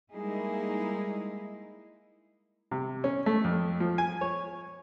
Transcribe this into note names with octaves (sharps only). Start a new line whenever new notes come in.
G3 G#3 A#3 D#4 E4 G#4
C3
C#4
A3
F2
F3
G#5
C#5